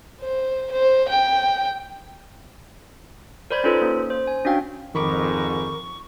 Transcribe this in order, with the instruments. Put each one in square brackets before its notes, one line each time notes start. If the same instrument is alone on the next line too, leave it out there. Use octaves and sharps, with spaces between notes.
[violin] C5
C5
G5
[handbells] A#4 C5 D5 B5 G6 G#6
C#4 D#4 F4 A4 B4 C5
A#3 C#4
C5
G#5
C#4 D4 F#4 F5 G5
[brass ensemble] F2 G#2 [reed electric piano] D#3 B5 D6 [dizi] A#4 [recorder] C#6